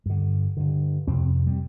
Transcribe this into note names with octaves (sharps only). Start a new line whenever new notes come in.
G2 D3
G2 D3
F2 C3 C4
G3